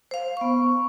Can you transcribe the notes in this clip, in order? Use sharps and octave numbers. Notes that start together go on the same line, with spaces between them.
C5 F5
B3 C#6